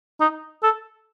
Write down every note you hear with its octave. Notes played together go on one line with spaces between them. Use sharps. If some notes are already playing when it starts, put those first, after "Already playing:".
D#4
A4